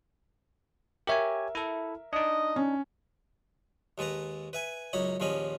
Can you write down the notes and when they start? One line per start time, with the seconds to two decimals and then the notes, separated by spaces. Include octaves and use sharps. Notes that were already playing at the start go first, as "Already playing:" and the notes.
1.07 G4 A#4 C#5 E5 G#5
1.55 E4 A4
2.13 D4 D#4 D#5
2.56 C#4
3.98 D#2 G#3 A4 B4 A#5
4.53 B4 E5 G#5
4.93 C#2 F#2 D#4 C#5 B5
5.20 A#1 D#2 F3 C#4 D#5 B5